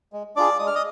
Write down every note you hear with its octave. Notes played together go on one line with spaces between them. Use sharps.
G#3
D4 F4 G#4 D5 D6
G#3 D#6
F6
D#5 D#6